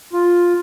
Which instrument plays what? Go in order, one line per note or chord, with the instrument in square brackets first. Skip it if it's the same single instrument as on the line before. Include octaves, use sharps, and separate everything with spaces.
[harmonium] F4